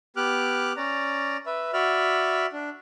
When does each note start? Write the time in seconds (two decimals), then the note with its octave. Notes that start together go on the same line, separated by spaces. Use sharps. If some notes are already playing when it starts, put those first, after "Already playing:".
0.16 B3 G4 D6 F6 F#6
0.77 C#4 D5 A#5
1.46 B4 E5
1.73 F#4 D5 E5 B5 F6
2.53 D4